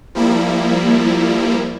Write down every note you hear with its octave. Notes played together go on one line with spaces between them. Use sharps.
F3 G3 A#3 E4